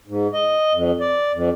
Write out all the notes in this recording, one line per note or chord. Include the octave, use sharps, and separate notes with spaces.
G#2
D#5
F2
D5
F2